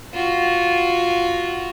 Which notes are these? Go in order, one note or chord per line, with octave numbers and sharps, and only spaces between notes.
F4 F#4